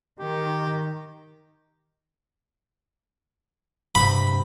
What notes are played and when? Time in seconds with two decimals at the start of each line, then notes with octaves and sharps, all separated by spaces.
0.19 D#3 G4
3.95 G2 C3 B5